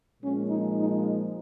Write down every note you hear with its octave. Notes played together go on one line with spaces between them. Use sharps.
A#2 F3 G#3 C#4
D#4
D#4